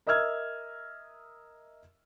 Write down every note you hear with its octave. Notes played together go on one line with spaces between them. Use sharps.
A#4 D#5 E5 E6 F6 G#6